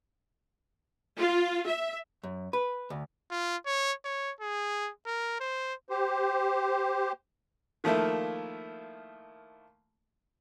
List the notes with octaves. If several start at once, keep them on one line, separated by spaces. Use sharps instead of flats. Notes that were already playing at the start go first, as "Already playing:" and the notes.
F4
E5
F#2
B4
D2
F4
C#5
C#5
G#4
A#4
C5
G4 C5
D#3 F3 A3 A#3 E4